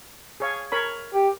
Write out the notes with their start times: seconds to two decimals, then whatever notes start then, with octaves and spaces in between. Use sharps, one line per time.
0.40 G#4 C#5 F5
0.72 A#4 C#5 B5
1.14 G4